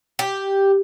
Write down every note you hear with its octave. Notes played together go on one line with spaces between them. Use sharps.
G4